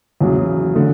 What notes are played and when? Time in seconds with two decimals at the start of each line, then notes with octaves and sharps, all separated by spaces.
0.21 E2 C#3 F#3
0.75 D3 A3